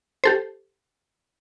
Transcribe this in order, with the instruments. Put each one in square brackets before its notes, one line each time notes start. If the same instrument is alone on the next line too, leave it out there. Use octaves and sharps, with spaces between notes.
[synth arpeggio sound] G4 A4 C5